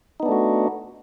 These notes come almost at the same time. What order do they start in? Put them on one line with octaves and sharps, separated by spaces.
D#4 B3 D4 A3 F#4